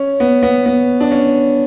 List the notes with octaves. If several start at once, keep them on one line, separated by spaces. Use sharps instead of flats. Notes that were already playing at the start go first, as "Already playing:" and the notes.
Already playing: C#4
B3
B3
B3
D4
C#4